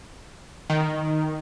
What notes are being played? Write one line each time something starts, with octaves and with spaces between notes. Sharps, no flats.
D#3